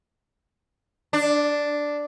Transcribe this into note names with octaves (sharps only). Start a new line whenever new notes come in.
D4